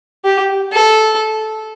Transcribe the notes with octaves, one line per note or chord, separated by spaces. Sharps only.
G4
A4